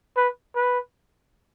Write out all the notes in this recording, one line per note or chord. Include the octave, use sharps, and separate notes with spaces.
B4
B4